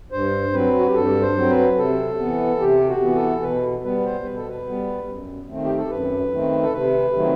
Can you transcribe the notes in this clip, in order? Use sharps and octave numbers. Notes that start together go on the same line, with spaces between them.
G2 C5
F#3 C4 B4
F#4
G4
G2 A4
C5
F#3 C4
B4
C3 A4
E3 B3
C3 G4
F#4
E3 B3
A4
B2 B4
G3 B3 B4
B4
C5
B2 B4
A4
B4
G3 B3
F#2
D#3 A3 C4
G4
A4
F#2 B4
D#3 A3 C4
A4
C3 B4
D#3 F#3 A3 C4